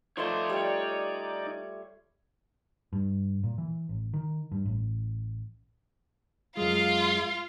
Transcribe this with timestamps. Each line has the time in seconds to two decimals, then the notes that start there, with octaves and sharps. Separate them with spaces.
0.17 F3 A3 D#4 C#5 D5 C6 C#6
0.49 G3
2.93 G2
3.44 A#2
3.58 E3
3.89 A1
4.14 D#3
4.52 G2
4.66 A1
6.57 F#2 G#3 F4 F5